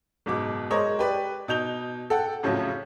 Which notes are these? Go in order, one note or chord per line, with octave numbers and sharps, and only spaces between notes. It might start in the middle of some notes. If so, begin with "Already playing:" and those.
F#1 G#2 B2 D6
G#3 A#4 C5 C#5 D#5
G4 B4 D5
B2 D#4 G6 F7 G7
A4 F#5 G5
F2 A2 C#3 F3 F#3